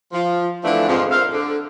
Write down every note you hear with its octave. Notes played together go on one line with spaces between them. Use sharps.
F3
D3 E3 F3 A3 B3 D4
F2 G#2 F3
A#4 C5 E5 F5
D3